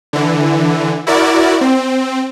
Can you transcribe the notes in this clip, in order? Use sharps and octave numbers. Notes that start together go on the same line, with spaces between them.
D3 E3
E4 F#4 A#4 D5
C4